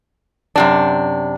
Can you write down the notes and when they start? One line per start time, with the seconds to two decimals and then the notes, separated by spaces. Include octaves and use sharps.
0.56 F#2 C3 D4